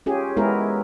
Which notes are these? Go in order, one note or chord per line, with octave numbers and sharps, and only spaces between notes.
C#4 F4 G4 G#4
G#3 B3 E4 G#4 A#4